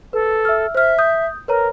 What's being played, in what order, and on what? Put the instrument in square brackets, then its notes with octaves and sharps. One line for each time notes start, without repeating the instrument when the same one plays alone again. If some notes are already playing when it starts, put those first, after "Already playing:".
[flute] A4 [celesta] B4
[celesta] E5 E6 F6
[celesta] C5 F6 [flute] E5
[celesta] D#6 G6
[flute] A#4 [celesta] B4 C#5 A#5